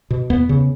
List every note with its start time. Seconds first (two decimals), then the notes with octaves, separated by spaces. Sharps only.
0.10 B2
0.30 E2 B3
0.49 C#3